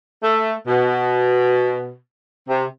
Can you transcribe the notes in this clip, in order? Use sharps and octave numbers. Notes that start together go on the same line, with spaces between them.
A3
B2
C3